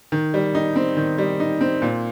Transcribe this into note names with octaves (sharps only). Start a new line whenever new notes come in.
D#3
G3
D#4
C4
D#3
G3
D#4
C4
A#2